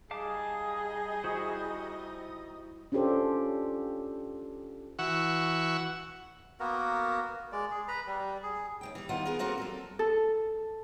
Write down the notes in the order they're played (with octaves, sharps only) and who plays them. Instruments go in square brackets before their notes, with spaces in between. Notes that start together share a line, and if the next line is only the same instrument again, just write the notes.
[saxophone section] G3 D#4 D#5 [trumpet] G#4 [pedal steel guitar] F5 A5 D6
[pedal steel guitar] E4 F#4 C5
[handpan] C#4 D4 F4 G4 A4 C5
[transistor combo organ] E3 F#4 F#5 C#6 E6
[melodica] A#3 B3 F#4 A#4
G#3 D5
G#4
B4 A#5 B5
G3
G#4
[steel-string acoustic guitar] D#2 F#3 G5
E3 G3
E2 D#3 G3 B3 F4 F#5
B3 G#4 A#4
A#3 C4 F4 F#4 A4 A#4
F#3 G3 A4
[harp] A4